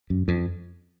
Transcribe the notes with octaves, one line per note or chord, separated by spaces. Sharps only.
F#2
F2